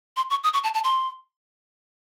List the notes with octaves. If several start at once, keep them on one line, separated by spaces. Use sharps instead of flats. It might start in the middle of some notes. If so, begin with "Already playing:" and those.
C6
C#6
D#6
C#6
A5
A5
C6